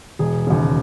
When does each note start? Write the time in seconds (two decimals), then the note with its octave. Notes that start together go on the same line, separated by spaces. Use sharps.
0.19 E1 G#4
0.47 D#2 C#3